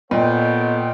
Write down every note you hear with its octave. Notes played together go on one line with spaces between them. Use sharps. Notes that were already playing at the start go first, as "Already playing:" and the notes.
A#2 B3 A4 C#5 D#5 G5